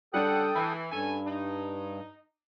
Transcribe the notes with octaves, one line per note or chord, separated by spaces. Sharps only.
C#3 G3 D4 A4 F#5 G5 D#6
E3 B5
G2 C#4 A4 G#5
D#4